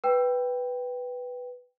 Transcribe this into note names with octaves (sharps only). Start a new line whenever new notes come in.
B4 G5